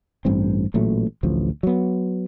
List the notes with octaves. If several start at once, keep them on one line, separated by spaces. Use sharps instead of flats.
A1 G2 C4
A1 A#2 F#3 A3
A1 D2 F3
F#3 B3